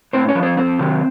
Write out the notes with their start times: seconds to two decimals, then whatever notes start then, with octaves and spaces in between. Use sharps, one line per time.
0.13 A2 C4 C5
0.28 C#4 C#5
0.35 F3
0.43 C4 C5
0.57 F2 C4 C5
0.79 C3 D#3 F#3